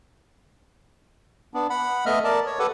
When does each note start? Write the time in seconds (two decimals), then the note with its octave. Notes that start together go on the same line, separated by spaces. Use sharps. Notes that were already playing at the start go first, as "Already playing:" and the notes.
1.54 B3 D4
1.70 F#5 B5
2.06 A3 B3 D#5 E5 F6
2.24 A#4 D5 A5
2.46 C#5
2.59 G4 A4 B4 F#5